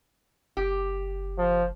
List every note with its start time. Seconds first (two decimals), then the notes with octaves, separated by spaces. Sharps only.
0.57 F#1 G4
1.38 F3